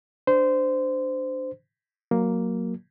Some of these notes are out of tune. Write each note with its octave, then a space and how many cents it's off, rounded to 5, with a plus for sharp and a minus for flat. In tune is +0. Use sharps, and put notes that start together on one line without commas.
D4 +0 C5 -20
F#3 +0 A#3 +0